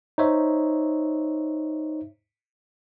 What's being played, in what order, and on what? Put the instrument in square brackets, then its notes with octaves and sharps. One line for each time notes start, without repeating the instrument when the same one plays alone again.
[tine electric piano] D#4 C5 C#5 E5